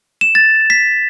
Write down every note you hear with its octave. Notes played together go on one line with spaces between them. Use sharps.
E7
A6
B6